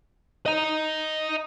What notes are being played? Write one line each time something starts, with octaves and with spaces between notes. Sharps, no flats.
D#5 A#5